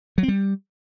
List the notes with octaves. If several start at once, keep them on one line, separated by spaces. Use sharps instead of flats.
F#3
C4
G3